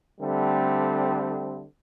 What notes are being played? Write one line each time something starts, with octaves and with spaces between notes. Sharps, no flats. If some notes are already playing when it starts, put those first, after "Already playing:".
D3 G3 A3 C4